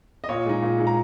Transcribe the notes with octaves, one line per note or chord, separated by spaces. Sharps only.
D#5
A#2 C#5
G#3 D#4
A#2
G#3 D#4
A#5